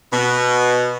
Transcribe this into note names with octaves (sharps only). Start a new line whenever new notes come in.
B2